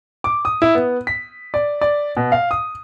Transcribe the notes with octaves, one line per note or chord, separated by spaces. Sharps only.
D6
D#6
E4
B3
B6
D5
D5
B2
F5
D#6